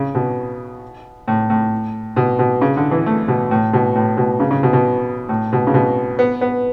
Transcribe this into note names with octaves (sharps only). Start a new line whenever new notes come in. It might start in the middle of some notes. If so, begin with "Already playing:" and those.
Already playing: C#3
B2
A2
A2
B2
B2
C#3
D3
E3
A3
B2
A2
B2
A2
B2
C#3
C#3
B2
B2
A2
B2
C#3
B2
B3
B3